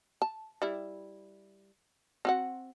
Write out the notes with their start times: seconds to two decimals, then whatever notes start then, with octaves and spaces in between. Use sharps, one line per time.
0.22 A5
0.62 G3 E4
2.25 C4 F#4 F#5